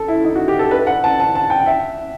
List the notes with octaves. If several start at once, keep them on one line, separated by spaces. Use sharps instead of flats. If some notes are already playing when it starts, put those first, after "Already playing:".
Already playing: A4
E4
D#4
F#4
G4
A4
B4
F#5
A5
A5
A5
G5
E5